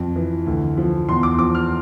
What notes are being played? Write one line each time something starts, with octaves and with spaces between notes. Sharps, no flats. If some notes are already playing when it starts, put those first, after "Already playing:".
Already playing: F2
E3
D2
F3
E2 C6
D6
F3 D6
F6